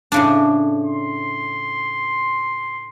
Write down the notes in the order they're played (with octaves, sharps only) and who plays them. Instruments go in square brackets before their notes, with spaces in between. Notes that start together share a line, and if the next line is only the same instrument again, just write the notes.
[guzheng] A2 C#3 D4
[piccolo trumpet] C6